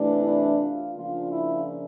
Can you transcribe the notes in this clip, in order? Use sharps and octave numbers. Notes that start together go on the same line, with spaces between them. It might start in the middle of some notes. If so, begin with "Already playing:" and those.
Already playing: C3 E3 A3 D4
E4
F4
C#3 F3 A#3 D4 F4
E4